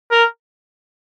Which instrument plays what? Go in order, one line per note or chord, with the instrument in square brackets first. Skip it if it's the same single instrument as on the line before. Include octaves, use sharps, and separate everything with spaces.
[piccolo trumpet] A#4